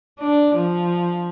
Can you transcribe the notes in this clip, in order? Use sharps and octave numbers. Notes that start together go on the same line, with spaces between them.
D4
F3